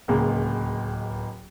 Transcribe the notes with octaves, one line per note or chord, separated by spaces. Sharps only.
D1 C#2 G#3 A#3